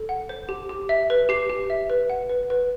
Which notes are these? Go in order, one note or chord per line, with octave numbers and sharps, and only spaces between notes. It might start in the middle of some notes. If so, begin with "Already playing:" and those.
Already playing: A4
F#5
C5
G4
G4
E5
B4
G4 C7
G4
E5
B4
F#5
B4
B4